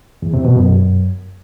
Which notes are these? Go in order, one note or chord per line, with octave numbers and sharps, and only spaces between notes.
E2
C3
B2
F#2